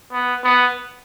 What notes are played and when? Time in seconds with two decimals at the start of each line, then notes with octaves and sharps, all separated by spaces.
0.12 B3
0.44 B3